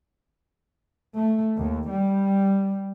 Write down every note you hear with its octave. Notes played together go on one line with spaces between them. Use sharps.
A3
D#2
G3